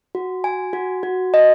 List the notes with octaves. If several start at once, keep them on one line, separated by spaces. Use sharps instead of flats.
F#4
G#5
F#4
F#4
D#5